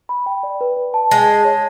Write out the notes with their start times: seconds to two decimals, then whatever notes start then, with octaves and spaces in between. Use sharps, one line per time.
0.09 B5
0.26 G5
0.43 D5
0.61 B4
0.77 B4
0.94 A5
1.11 G#3 A5
1.29 A5
1.45 C#5